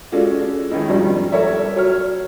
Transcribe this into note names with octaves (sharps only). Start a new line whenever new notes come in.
G#3 C#4 F4 F#4 A4 D5
D#3 G#3 C#4 D#4 E4
G#1 G2 B2 F3 G3
A4 A#4 C#5 D5 E5
F#3 C#5 F6